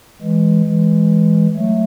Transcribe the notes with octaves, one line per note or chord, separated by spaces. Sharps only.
E3 G#3
E3 G#3
F#3 A3